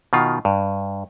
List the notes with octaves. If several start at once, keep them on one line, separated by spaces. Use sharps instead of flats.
B2 D#3 F4
G2